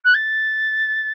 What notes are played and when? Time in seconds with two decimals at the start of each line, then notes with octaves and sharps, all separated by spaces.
0.04 F#6
0.14 A6